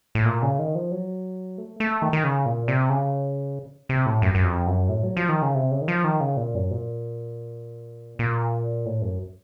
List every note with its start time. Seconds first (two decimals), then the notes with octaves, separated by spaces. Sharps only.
0.15 A2
0.25 A#2
0.42 C#3
0.59 D#3
0.75 F3
0.92 F#3
1.58 A3
1.80 A3
2.02 D#3
2.13 D#3
2.24 C#3
2.46 A#2
2.68 C3
2.89 C#3
3.89 C3
4.06 A2
4.22 F#2
4.35 F#2
4.44 F2
4.67 F#2
4.89 A2
5.03 F#3
5.17 F3
5.29 D#3
5.42 C#3
5.55 C3
5.71 C#3
5.82 D#3
5.88 F3
6.04 D#3
6.20 C#3
6.37 A#2
6.55 F#2
6.71 A#2
8.19 A#2
8.86 A2
9.02 F#2